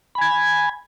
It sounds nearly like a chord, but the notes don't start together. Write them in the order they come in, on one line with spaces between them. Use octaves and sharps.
B5 G#5 G#6